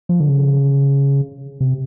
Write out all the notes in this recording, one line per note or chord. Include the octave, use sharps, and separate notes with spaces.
F3
D3
C#3
C3